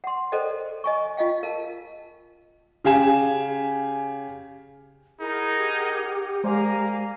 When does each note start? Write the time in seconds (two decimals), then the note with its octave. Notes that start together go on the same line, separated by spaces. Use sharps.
0.04 F#5 C6
0.32 A4 A#4 C5 D5 D#5 G5
0.84 D#5 G#5 C#6
1.17 F4 D#5 F5 G5
1.43 A#4 F5 A5
2.84 C#3 G4 F5 G#5 E7
5.20 D#4 E4 G#4 A#4 F#5
5.58 G4
6.44 G#3 A#3 C5 D5 F5 G#5 A#5